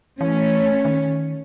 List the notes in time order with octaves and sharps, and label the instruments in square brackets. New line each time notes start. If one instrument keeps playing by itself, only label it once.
[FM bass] E3 [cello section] A3 C#4 [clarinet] C#5
[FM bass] D#3